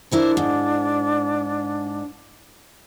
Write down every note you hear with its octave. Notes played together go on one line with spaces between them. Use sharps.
D4 E4 A#4 C5
G#2